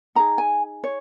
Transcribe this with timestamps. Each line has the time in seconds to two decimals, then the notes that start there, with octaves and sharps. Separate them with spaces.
0.15 D#4 G#4 A#5
0.38 G#5
0.84 C#5